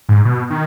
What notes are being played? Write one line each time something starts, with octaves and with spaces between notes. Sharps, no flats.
G#2
B2
D#3